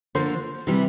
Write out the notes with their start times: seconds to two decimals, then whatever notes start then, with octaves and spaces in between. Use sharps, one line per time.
0.15 D3 F3 A#3 D4 C5
0.67 C3 E3 G3